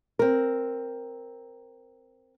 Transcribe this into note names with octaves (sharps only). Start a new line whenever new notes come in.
C4 A#4